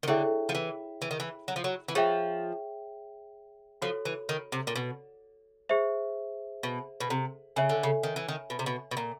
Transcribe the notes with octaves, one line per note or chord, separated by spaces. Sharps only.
D#3
D3 E4 G#4 C#5 E5 G5
F3
E3
E3
D#3
E3
F#3
F3
F#3
E3
F3 G#4 C#5 E5 G5
F3 F#4 A4 C#5
E3
D#3
C3
A#2
B2
G#4 C5 E5
B2
B2
C3
C#3 C#5 E5 G#5
D3
C#3
D#3
E3
D#3
B2
C3
B2
B2
A#2